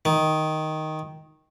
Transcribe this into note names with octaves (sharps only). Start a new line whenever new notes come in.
D#3